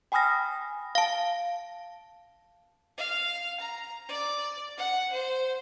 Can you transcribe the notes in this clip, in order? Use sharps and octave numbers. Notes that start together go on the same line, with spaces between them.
G5 G#5 B5 D#6 F6 A#6
F5 A5
F5
A#5
D5
F#5
C5